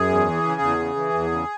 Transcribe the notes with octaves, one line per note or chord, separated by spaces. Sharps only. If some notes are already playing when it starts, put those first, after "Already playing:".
Already playing: F#2 G#4
E2
E3
C#3
E2
C#3
E3
E2
C#3